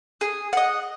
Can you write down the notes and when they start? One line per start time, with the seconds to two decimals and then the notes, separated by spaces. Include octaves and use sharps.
0.21 G#4
0.53 D#5 F#5